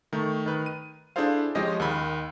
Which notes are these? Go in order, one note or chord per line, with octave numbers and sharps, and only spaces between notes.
D#3 A3
D#3 B4
D#7
D4 E4 G#4 A4 C5 F5
F3 G#3 C#4 G4 D#5
D#2 D#3 B5